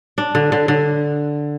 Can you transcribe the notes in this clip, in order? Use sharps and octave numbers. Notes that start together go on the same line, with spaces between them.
D4
D3
D3
D3